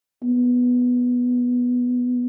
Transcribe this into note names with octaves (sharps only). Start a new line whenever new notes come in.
B3